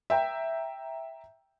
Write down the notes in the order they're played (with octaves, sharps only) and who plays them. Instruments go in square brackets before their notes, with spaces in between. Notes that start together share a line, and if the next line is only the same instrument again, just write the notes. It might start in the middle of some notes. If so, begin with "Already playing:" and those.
[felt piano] E5 G5 A#5